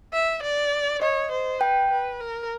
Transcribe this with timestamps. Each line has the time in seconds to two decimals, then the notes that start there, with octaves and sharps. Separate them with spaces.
0.13 E5
0.43 D5
1.02 C#5 D#5
1.31 C5
1.61 B4 G5
1.91 B4
2.21 A#4